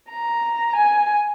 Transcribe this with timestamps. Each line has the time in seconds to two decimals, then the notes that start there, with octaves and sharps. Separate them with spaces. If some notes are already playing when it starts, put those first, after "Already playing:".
0.10 A#5
0.77 G#5